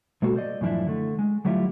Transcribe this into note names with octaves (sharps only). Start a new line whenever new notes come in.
B2 G#3 A#3 F#4 A4
C5 D5 D#5
F#2 A2 E3 F3 D4 E4
D3 A3
G#3
D3 F#3 G3 A3 E4 F4